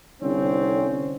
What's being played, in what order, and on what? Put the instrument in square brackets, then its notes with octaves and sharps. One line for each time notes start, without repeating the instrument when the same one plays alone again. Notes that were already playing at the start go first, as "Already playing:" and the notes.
[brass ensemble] C2 D3 C4 C#4